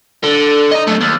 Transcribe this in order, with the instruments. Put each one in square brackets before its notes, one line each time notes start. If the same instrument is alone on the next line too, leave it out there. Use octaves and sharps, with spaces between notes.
[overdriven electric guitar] D3
D#5 A#5
F#3 A3
D#2